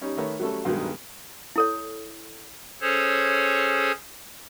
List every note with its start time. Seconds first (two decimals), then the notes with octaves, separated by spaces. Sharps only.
0.01 G3 C#4 D#4
0.17 D#3 A3 A#4 B4 C#5
0.40 F#3 G3 A3 C#4 A4
0.65 B1 G2 B2 D#3 F#3 G#3
1.56 E4 A4 C#5
2.81 C#4 G#4 A4 C5 C#5